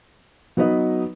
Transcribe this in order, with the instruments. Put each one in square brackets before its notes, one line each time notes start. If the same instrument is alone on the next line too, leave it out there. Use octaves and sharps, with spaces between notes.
[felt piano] F#3 B3 D#4 B4 D#5